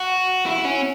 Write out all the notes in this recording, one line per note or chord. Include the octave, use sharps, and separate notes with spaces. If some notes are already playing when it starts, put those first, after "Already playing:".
Already playing: F#4
E4
C#4